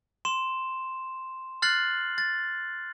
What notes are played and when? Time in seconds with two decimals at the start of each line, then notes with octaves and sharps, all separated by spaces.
0.25 C6 E7
1.62 F6 F#6 A6 C7 F#7
2.18 A6